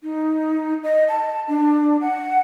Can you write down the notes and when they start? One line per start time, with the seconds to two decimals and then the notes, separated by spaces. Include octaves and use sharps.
0.03 D#4
0.83 D#5
1.09 A5
1.48 D4
2.01 F#5